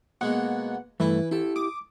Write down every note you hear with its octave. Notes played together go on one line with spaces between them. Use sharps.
B2 G#3 A#3 F#5
G2 E3 A3 E4 B4
E4 G4 A4
D6 D#6